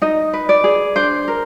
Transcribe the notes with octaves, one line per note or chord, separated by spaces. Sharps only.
D#4 D#5
B4
D5
G#4
D4 C5
A#4